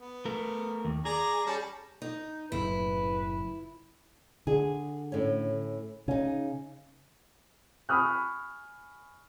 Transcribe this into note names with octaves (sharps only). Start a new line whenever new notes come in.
B3
A3 A#4
D#2
G#4 D5 A#5
G3 C#4 A5
D#4
F#1 A2 C#3 E4 B4
D3 G#4
A2 C#4
C#3 C#4 D#4
G#5 B5 C#6 D#6 F6 F#6